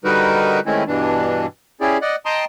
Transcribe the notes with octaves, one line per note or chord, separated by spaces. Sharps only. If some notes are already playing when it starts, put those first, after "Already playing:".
D3 G3 D#4 F#4 A#4 B4
D#3 G#3 A3 C4 C#4 E4
G2 B2 E3 D4
C#4 E4 G4 G#4 D5
D5 D#5 F#5
D#5 G5 A5 A#5 C6 D#6